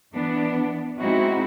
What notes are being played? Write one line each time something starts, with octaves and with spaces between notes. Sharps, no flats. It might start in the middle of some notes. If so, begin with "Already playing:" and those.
E3 B3 D4
G#3 C4 D#4 E4 F#4